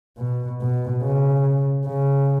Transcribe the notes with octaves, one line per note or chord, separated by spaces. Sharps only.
B2
B2
C#3
C#3